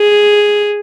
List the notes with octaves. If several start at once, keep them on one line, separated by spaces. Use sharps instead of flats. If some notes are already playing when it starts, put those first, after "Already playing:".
Already playing: G#4